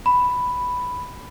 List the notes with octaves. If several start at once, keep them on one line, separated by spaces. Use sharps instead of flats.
B5